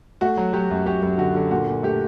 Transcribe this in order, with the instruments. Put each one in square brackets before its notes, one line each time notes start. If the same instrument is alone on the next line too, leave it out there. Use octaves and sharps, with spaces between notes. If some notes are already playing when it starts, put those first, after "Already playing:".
[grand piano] A3 F#4
F#3
F#3 G4
F#2
F#2 G4
F#2
D3 F#4
D3
A#2 F#4
A#2
A3 G4